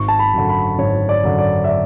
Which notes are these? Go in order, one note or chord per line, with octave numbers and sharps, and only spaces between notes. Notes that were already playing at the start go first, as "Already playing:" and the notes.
Already playing: G#1 C#6
A5
B5
F#2 D3
B5
G#1 C#5
D5
F#2 D3
D5
E5
D5